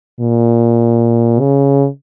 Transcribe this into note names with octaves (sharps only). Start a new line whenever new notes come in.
A#2
C#3